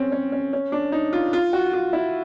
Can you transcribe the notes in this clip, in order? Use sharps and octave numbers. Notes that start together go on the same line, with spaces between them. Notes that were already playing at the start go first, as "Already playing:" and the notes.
Already playing: C4 C#4
C#4
C#4
C#4
D4
D#4
F4
F4
F#4
F4
E4